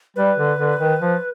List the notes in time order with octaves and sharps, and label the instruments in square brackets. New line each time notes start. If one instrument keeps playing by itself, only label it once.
[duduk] G3 [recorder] B4
[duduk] D3
D3
D#3
F3